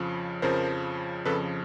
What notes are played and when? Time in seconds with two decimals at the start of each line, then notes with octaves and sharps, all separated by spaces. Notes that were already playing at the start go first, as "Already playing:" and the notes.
Already playing: F2 C#3 F3
0.42 F2 C#3 F3 A#4 C5
1.25 F2 C#3 F3 A4 B4